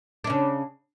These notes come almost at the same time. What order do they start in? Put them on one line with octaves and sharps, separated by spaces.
D4 C#4 C#3